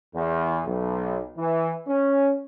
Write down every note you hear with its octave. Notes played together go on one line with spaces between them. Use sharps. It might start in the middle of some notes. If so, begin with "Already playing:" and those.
E2
B1
E3
C#4